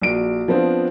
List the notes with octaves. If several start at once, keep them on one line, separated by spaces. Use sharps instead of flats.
A#1 F#4 D7
F3 B3 C4 D4 F4